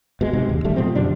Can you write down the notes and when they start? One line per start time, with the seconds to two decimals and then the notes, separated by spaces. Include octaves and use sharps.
0.21 B2 G#3
0.33 G#2 C3 G#3
0.49 D#2
0.64 D#1 A1 G3 A3
0.76 B2 F3 G#3 C4
0.95 F#2 D3 G3 D4